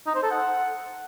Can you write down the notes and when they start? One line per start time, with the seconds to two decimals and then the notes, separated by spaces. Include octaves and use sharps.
0.07 D#4
0.15 C5
0.23 A4
0.31 F#5